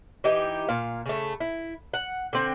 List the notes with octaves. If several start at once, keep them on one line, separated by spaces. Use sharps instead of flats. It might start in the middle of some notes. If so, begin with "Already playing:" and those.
E3 D#4 G4
A#2 F5
C#3 A3
E4
F#5
D3 C4